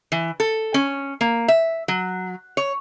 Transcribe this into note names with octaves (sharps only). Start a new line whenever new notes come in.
E3
A4
C#4
A#3
E5
F#3
C#5